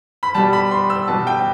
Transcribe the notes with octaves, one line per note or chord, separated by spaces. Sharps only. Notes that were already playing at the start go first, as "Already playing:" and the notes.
B5
B2 G3 A5
B5
C6
E6
B2 G3 A5
G5